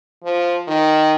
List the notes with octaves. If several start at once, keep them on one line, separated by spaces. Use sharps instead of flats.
F3
D#3